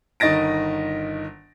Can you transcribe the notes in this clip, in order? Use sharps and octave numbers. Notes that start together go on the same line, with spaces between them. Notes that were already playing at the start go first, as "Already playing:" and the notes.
G1 D#3 D#5 A6 A#6 D7